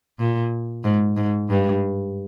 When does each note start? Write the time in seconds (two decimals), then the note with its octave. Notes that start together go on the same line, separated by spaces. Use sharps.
0.19 A#2
0.84 G#2
1.17 G#2
1.50 G2